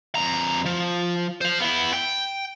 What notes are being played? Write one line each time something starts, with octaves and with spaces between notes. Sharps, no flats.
F2 A#5
F3
C5 F5
B3 E4
G5